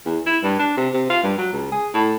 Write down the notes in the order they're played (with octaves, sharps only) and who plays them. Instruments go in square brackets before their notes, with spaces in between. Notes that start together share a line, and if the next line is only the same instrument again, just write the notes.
[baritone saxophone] E2
E4
G2
D4
C3
C3
F4
G2
F#3
C#2
G#4
A2